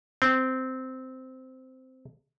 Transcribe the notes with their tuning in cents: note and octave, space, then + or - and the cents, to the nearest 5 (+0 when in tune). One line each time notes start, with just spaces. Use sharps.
C4 -10